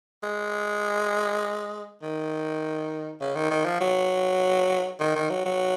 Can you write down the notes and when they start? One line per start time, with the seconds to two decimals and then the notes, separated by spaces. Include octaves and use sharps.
0.23 G#3
2.02 D#3
3.21 C#3
3.35 D#3
3.51 D#3
3.65 F3
3.81 F#3
5.00 D#3
5.15 D#3
5.29 F#3
5.45 F#3